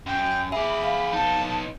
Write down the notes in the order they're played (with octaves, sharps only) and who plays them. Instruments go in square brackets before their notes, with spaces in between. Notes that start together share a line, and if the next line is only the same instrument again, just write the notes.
[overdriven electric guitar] F#2 [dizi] G5
[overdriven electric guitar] G#4 D5 [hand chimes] E5 [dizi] B5
[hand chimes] F5
[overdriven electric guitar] B3 D#4 [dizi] A5